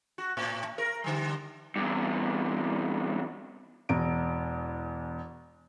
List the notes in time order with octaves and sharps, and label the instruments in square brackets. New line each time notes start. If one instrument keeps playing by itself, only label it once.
[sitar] F#4
A2
A#4
D3 G3
[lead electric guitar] E2 G2
[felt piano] E1 E2 D7